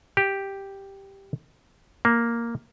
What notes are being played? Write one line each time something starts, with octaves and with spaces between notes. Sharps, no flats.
G4
A#3